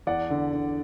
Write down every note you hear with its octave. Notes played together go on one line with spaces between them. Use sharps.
E2 D5 F#5
D3
D3